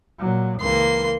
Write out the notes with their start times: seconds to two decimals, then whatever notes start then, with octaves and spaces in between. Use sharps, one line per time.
0.19 A#2 F#3
0.61 C#2 E3 A#3 C6